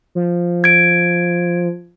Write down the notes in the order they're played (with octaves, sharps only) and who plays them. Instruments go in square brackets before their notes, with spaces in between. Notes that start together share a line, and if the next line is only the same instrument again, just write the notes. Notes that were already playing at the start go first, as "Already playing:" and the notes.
[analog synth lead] F3
[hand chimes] G#6 D7